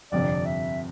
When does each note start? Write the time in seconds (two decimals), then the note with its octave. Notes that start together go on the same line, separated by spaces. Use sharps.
0.11 G1 F2 C3 D5
0.45 E5